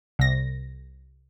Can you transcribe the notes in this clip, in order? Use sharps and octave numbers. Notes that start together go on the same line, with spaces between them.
C2 A#6